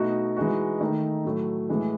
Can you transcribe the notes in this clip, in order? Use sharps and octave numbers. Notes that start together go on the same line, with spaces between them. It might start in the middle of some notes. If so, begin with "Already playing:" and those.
Already playing: B2 A3 D#4 F#4
E3 G#3 D#4 F#4
D#3 A3 D#4
A2 F#3 A3
A2 E3 G#3